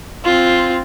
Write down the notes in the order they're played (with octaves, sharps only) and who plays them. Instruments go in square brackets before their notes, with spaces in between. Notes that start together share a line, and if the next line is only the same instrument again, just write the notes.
[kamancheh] C4 F4